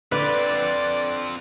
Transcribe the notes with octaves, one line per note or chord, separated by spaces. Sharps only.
D3 C4 F4 B4 D5